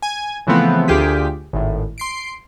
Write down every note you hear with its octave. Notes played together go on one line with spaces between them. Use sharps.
G#5
C#3 E3 F3 A3 B3 C4
D2 F4 G4 G#4 B6
G#1 A2
C6 C7 D7